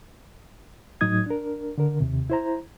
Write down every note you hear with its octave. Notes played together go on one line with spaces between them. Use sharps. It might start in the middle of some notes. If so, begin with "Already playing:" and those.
A2 F#3 D#4 D#6 G#6
D4 A#4
D3 A#4
D#2 C3
E4 C5 A#5